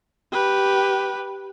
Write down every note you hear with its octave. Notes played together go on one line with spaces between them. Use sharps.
G4 B4